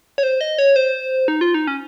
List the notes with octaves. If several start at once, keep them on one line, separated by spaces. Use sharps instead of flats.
C#5
C5
D#5
C#5
C5
D#4
F4
D#4
C#4